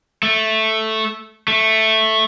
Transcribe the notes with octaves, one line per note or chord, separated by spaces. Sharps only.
A3
A3